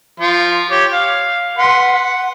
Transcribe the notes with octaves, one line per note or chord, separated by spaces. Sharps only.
F3 F4 C6
G4 C#5
F5
B4 F#5 C6
F#5